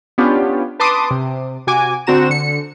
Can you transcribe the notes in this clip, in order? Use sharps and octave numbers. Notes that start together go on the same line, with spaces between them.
B3 C#4 D4 F4 G4
B4 A5 C6 D6 D#6
C3
C3 F#4 G#5 D6
D3 C4 F#4 A#5 E7
D3 C#7